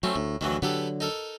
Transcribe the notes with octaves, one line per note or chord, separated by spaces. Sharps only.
F#3 A3 C4 C#4
D2 A2
D2 D#3 E3 F#3
D3 F#3 B3 G4 A4
D#4 A4 A#4